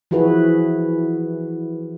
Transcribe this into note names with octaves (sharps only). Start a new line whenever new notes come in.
E3 F3 E4 F#4 G#4 B4